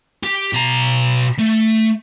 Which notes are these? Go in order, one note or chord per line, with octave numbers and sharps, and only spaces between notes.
G4
B2 A#5
A3